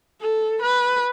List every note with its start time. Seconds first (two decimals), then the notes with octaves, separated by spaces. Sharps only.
0.21 A4
0.62 B4